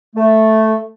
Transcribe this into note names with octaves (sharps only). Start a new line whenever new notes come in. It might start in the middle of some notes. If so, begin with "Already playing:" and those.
A3